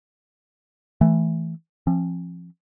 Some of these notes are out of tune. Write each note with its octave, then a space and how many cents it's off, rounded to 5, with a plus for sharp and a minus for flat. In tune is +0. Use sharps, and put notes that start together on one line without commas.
E3 +0 A3 +0
F3 -20 C4 +45